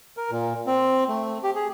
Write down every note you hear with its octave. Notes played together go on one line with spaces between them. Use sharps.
A#4
A#2
C4
A3
G4
G#4